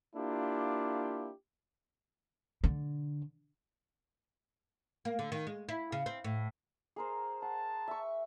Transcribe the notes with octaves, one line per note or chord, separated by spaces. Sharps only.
A#3 D4 E4 F4 G4
D3
A#3
D3
D#3
G#3
E4
C#3
C4
A2
G#4 A#4 C5
F#5 A5
E5 C#6